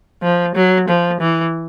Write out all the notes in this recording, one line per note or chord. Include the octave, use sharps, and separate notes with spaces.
F3
F#3
F3
E3